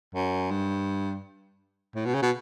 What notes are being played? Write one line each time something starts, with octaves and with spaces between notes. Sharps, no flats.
F#2
G2
A2
B2
C#3
B2